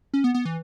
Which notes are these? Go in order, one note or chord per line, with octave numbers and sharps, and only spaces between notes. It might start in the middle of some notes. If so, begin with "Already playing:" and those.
C#4
B3
B3
E3